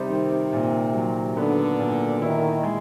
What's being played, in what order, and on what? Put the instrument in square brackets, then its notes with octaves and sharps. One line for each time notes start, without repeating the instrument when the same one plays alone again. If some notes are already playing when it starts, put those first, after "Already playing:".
Already playing: [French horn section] C3 [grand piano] G3 C4 D#4
[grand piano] D#3
A#2
F#3
[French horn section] D3 [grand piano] B3
[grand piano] A#2
[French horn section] D#3 [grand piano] E4
[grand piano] G#3